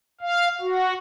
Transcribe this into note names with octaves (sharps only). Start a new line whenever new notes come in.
F5
F#4